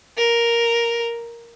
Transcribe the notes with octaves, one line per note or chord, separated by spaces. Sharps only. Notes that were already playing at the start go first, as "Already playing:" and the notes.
A#4